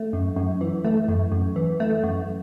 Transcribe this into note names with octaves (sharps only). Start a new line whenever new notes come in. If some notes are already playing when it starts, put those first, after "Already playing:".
Already playing: A3
F#2
F#2
E3
A3
F#2
F#2
E3
A3
F#2